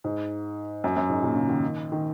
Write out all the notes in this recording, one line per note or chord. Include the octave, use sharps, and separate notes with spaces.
G#2
F#2
F#2
G#2
A#2
C#3
D#3
D#3